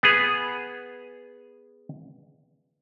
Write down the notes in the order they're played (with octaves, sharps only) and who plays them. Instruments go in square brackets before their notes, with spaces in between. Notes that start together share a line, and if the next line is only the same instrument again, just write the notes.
[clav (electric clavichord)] B3 G#4